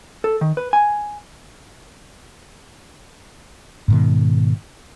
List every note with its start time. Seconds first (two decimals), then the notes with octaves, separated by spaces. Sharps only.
0.24 A4
0.41 D#3
0.57 B4
0.73 G#5
3.88 G#2 B2 D#3